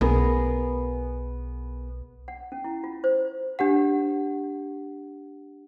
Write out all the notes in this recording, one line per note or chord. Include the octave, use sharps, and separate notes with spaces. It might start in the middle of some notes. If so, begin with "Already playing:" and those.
B1 B3 G#4 A#4
F#5
C#4
E4
F4
C5
D4 G4 F#5